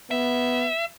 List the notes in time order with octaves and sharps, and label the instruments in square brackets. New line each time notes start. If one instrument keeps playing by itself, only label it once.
[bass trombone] B3 [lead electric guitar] E5